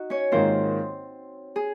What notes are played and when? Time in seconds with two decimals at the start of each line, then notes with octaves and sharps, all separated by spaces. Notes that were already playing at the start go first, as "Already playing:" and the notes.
Already playing: D#4 F#4
0.10 C#4 C#5
0.32 G#2 D#3 A#3 C4 F4 C5
1.56 G#4